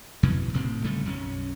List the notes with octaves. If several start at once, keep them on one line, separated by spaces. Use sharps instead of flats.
F2 B2 E3
F1 B1 A2 C4
G1 C#3 G3 A3
B1 F#2 C4 C#4